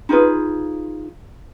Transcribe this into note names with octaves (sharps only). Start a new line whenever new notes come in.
D#4 F4 G#4 B4